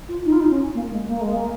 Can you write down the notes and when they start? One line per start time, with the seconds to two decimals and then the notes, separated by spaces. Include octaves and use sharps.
0.09 F4
0.25 D#4
0.32 F4
0.40 D#4
0.50 C#4
0.75 A#3
0.91 G#3
1.07 A#3
1.21 G#3
1.33 A#3